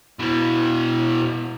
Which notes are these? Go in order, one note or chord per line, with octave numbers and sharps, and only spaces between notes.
B2 E3